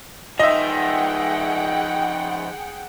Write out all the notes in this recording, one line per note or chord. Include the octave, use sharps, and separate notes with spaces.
F3 D#4 G#4 D#5 E5 F#5 G5